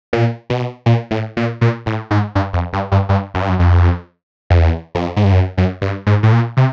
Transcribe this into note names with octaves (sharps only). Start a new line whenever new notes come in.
A#2
B2
A#2
A2
A#2
A#2
A2
G#2
G2
F2
G2
G2
G2
F#2
G2
F#2
F2
F2
E2
F2
G#2
G2
F#2
F#2
G2
G#2
A2
A#2
C3